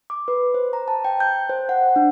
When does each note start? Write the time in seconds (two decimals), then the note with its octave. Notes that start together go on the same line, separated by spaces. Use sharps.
0.10 D6
0.28 B4
0.54 C5
0.73 A#5
0.88 A5
1.05 G5
1.20 G6
1.49 C5
1.69 F#5
1.96 D4